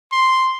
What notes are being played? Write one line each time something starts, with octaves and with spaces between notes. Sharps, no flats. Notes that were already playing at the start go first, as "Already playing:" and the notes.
C6